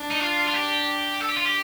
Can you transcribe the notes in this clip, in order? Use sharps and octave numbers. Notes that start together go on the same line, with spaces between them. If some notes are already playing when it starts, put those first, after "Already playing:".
Already playing: D4
D#4
F4
F4
G4
A4
G4
F4
G4